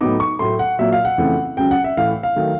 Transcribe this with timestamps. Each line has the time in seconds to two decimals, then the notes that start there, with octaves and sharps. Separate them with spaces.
0.01 A2 F#3 B3 D#4 D6
0.20 C#6
0.39 A2 F#3 A3 C6
0.59 F#5
0.79 A#2 F#3 A#3 E5
0.93 F5
1.05 F#5
1.18 F2 C#3 E3 A3 C4
1.57 C#2 C#3 F#3 G5
1.71 F#5
1.84 E5
1.97 A2 E3 A3 F5
2.23 F5
2.36 D#3 F#3 A3